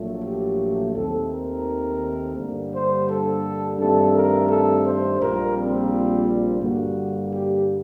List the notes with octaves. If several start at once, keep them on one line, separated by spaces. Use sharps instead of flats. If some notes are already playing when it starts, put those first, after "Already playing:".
Already playing: A#1 A#2 F#3 A3
G4
D#2 D#3 A3 C4 A4
A#4
G2 D3 G3 A#3
C5
A4
G2 D#3 A3 C4 A4
A#4
A4
C5
A#1 A#2 G3 A#3 A#4
C4
G2 D3 G3 A#3 F#4
G4